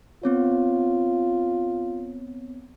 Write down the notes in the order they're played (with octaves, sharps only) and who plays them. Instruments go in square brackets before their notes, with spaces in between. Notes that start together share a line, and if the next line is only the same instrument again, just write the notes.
[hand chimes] B3 C4 C#5 [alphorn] F4